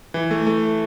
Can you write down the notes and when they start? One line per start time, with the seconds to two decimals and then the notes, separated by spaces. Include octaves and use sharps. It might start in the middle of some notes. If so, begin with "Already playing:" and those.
0.14 E3
0.31 A3
0.47 A3